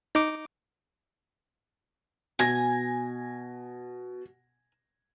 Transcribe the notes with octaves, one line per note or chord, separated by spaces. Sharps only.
D#4 D6
B2 G#5 G#6 A#6